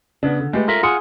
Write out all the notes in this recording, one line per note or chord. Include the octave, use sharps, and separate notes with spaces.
C#3 B3 D4
D3
G#3 A3 G4 B4
A3 F4 A#4 E5
F4 G#4 F#5 C6 D#6